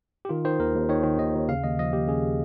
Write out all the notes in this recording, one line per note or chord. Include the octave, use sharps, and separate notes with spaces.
G4
D#3 F4
D#3 C5
D#2 A#4
D#2
D#3 C#5
D#3
D#2 D#5
D#2
C#3 F5
D#2 D#5
F3 D#5
D#2 G4
C#3 G#4